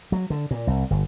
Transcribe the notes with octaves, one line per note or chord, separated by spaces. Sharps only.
F#3
D3
A#2
C2
G1